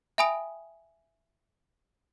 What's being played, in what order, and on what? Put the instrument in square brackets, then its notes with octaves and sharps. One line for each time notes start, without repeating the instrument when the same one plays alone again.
[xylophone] E5 G5 G#5 B5 D#6 D7